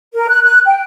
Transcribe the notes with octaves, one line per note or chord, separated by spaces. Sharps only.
A#4
F#6
F#6
G5